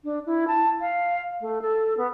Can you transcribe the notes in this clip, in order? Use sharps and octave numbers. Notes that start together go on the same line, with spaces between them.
D4
E4
A5
F5
A3
A4
B3